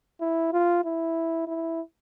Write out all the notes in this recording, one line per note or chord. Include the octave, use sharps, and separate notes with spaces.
E4
F4
E4
E4